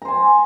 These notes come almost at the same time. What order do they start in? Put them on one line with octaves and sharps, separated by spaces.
A#5 C5 G#5